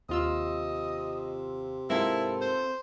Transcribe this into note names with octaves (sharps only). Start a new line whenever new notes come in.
D#2 C3 F4 D#5 E6
G#2 A#3 C4 E4 F4 A4
C5